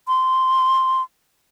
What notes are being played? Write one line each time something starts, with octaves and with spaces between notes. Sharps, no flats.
C6